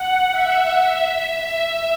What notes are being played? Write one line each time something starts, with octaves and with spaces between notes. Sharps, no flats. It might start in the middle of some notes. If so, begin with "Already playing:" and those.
Already playing: F#5
E5
E5
E5